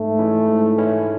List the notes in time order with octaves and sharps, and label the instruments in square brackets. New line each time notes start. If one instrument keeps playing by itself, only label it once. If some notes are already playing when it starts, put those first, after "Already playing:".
Already playing: [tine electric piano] G#2 [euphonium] A3
[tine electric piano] E3 G#3 C#4 E4
G#2
E3 G#3 C#4 E4